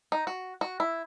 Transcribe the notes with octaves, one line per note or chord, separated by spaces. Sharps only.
D#4
F#4
F#4
E4